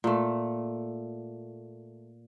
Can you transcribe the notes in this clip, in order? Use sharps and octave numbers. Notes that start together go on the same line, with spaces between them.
A#2 A3